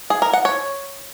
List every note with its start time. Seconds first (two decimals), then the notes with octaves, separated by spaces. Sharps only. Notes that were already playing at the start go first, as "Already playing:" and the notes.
0.10 G#4
0.22 A#4
0.33 F#5
0.45 C#5